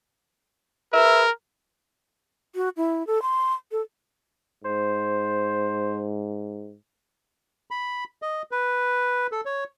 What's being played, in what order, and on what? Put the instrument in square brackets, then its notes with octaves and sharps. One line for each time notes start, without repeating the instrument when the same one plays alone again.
[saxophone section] G#4 B4 E5 [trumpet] A#4
[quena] F#4
E4
A4
C6
A4
[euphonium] G#2 [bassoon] C5
[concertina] B5
D#5
B4
A4
C#5